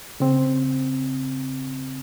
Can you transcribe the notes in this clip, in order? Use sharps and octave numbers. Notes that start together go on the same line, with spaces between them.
C#3 C4